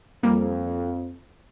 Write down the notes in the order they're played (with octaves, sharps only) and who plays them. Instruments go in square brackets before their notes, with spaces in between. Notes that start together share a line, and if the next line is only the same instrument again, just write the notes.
[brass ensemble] F2 [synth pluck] G3 A#3